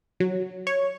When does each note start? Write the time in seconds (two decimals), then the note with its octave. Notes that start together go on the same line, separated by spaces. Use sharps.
0.20 F#3
0.67 C#5